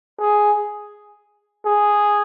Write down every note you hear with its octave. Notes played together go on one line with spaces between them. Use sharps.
G#4
G#4